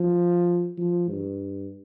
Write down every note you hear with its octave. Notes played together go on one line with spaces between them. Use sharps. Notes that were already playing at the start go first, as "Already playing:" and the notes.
Already playing: F3
F3
G2